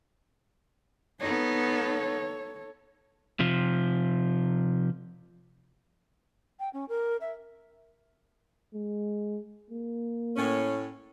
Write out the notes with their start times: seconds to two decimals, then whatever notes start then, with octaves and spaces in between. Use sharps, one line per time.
1.20 B3 D#4 A4 C#5
3.40 C3 F3
6.59 G5
6.73 C#4
6.88 A#4
7.20 E5
8.74 G#3
9.70 A#3
10.37 A2 C#4